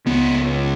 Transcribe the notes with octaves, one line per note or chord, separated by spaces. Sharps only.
C#2 C#3 B3